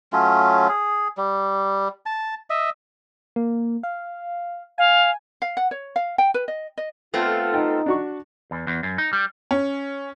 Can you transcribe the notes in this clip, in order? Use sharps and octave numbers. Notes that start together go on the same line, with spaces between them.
F#3 A3 C#4 F4
G#4
G3
A5
D#5 E5
A#3
F5
F5 G#5
F5
F#5
C#5
F5
G5
B4
D#5
D#5
A3 B3 C4 F4 A4
D#4 G5
D4 F#4 C#6
E2
E2
F#2
D#4
G3
C#4